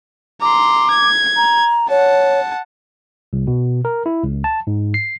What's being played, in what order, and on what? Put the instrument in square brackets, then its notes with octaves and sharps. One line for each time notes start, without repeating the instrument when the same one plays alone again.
[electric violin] A#5 C6 [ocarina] D6
[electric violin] G#6
[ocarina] A#5
[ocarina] C#5 [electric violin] F#5 A5
[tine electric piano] C2
B2
A#4
E4
C#2
A5
G#2
C7